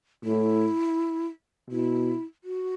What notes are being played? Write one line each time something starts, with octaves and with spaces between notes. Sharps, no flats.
A2 E4
B2 E4
F#4